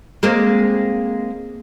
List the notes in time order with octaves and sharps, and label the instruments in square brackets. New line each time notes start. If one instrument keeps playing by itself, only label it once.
[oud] G#3 A#3 C4